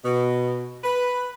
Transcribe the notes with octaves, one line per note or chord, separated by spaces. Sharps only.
B2
B4